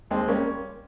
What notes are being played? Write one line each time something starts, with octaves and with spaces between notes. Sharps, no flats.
D#2 G#3 C4
G3 A#3 C#4